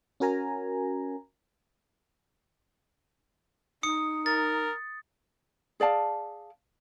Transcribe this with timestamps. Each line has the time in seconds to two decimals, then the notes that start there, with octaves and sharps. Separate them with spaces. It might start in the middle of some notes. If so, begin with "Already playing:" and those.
0.20 C#4 F#4 A#4 G#5 A#5
3.83 D#4 D#6 C#7
4.26 A#4 A6
5.80 G#4 D5 F5 A5